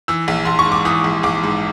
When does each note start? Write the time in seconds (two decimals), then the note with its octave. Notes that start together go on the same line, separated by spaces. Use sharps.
0.08 E3 E6
0.28 A#1
0.45 A#1 C6
0.59 C#6
0.66 G#2
0.72 D6
0.85 E3 D#6
1.04 A#1
1.23 A#1 D6
1.43 G#2